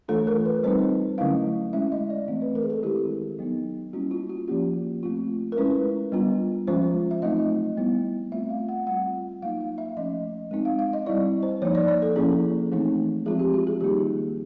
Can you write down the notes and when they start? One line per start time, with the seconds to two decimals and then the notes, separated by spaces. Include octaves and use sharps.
0.08 E3 A3 D4 F4 A4
0.27 A#4
0.45 B4
0.64 G3 C4 D#4 C5
1.18 D3 F#3 A3 C#4 E4 F5
1.73 G#3 C#4 E4 E5
1.92 D#5
2.10 D5
2.28 E3 A3 C4
2.42 B4
2.55 A#4
2.63 G#4
2.70 A4
2.83 D#3 G#3 C4 E4 G4
3.39 F#3 B3 D#4
3.93 G3 A#3 C#4 E4 F#4
4.11 F4
4.29 F#4
4.48 F3 A#3 C#4 G4
5.03 A3 C4 F4
5.52 A#4
5.57 G#3 C#4 E4 B4
6.12 G3 B3 D4 F4
6.67 F3 G#3 C#4 F4 C5
7.11 E5
7.22 F#3 A3 C4 D#4 D#5
7.77 G3 B3 E4
8.32 A3 C4 F4 E5
8.50 F5
8.68 F#5
8.87 G3 C4 F4 F#5
9.42 F#3 A#3 D#4 F5
9.61 F5
9.78 E5
9.97 F3 A3 C#4 D#5
10.51 G#3 C4 D#4
10.65 F5
10.79 F5
10.93 D#5
11.06 G3 C4 E4 D5
11.43 C5
11.62 F3 A#3 D#4 C#5
11.75 D5
11.88 D5
12.02 A4
12.16 F3 A#3 C#4 E4 G#4
12.72 E3 A3 C4 D#4
13.26 F3 G#3 C4 F4 G#4
13.39 G4
13.54 F#4
13.67 G#4
13.81 D#3 G3 A#3 D#4 G4